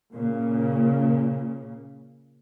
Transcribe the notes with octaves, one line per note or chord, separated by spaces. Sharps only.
A#2 C#3